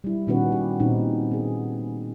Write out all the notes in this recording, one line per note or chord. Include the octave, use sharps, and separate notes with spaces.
G3 E4
A#2 D#3 B3 C#4 F#4 B4
G4
A#2 C4 C#4 D#4
B3 G#4